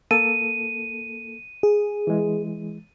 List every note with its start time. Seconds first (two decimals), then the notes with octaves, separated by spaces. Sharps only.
0.11 A#3 A4 D#7
1.63 G#4
2.07 E3 G#3